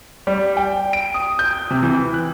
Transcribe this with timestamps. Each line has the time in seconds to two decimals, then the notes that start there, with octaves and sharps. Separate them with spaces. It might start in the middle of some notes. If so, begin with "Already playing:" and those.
0.27 G3
0.57 G5
0.93 D7
1.14 D#6
1.39 G6
1.71 C3
1.82 E3
2.14 F#6